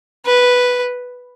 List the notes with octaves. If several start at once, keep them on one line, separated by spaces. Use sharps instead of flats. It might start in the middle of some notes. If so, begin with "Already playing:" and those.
B4